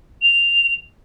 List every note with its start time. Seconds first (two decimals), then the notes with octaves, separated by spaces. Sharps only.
0.22 F7